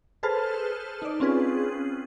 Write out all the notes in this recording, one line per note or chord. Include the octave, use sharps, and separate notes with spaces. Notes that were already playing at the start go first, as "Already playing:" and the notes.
G#4 A4 B4 C5 A5 F6
D#4 D5
C4 C#4 F4 G#4 B4